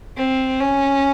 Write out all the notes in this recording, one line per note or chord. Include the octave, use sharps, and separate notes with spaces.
C4
C#4